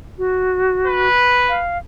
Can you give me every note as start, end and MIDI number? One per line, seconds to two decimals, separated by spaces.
0.18 1.08 66
0.86 1.61 71
1.49 1.78 77